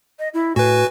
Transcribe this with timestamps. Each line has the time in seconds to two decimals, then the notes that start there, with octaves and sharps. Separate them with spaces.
0.19 D#5
0.34 E4
0.56 A2 F#4 B4 G#5